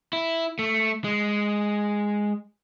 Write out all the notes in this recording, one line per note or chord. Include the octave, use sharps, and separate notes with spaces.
E4
A3
G#3